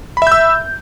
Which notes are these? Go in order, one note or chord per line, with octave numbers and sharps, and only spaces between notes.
E5 B5 E6 G6